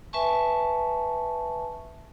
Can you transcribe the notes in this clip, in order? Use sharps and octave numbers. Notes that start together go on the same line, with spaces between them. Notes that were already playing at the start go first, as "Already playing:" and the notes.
B4 E5 G#5 A5 C#6